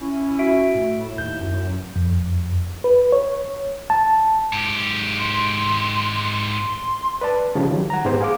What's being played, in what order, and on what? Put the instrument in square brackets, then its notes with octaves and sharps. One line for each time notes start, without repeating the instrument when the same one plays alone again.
[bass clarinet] C#4 [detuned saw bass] E4
[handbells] F#4 E5 D7
[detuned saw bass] A2
[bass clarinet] E4
[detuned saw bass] D#2 [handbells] G6
[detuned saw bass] F#2
[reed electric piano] F2
B4
C#5
A5
[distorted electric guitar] G#2 G4
[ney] C6
C6
[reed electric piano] B4 D5 A5
C#3 F3 G3
D#3 F#3 G3
F#5 A#5
G#2 G#3 B3 G4 C5
G#4 F5 D6